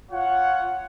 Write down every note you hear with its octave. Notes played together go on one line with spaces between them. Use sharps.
F4 C#5 F#5